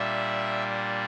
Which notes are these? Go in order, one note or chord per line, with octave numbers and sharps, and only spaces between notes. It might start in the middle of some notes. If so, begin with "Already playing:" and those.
Already playing: A#2 G3 D4 E5